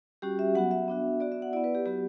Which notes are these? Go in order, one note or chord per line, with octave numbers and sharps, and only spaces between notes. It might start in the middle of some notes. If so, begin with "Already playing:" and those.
G3 C#4 F#4 G4
E5
F#3 B3 F#4 F#5
E5
B3 D4 F#4
B3 F#4 D5
E5
F#5
B3 E4 D5
B4
G4
F#3 B3 F#4 G4